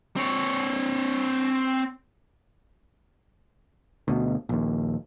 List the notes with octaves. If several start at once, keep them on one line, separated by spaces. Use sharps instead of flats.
C4 C#5
D2 B2
A#1 D#2